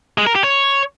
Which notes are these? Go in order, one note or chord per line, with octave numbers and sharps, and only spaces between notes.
G#3
A#4
G4
C#5